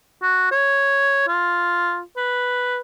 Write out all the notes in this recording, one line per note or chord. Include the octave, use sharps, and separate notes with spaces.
F#4
C#5
F4
B4